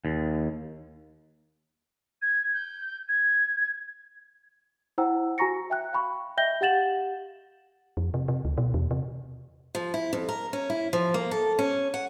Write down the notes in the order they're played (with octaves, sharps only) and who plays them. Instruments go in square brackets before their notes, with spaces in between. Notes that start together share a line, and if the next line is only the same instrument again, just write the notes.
[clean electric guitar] D#2
[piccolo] G#6
G6
G#6
[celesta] E4 C5 F#5 G5 A#5 E6
F#4 G#5 A#5 C#6 A#6 C#7
E5 G5 F#6
F5 G5 B5 C#6
D#5 E5 G5 G6 A#6 G7
G4 F5 F#5 A6 E7 F#7
[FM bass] F2
C3
C3
D2
B2
E2
C3
[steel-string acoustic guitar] F3
E4
F2
A#4
C#4
E4
F3
A#3
A4
C#4
F#5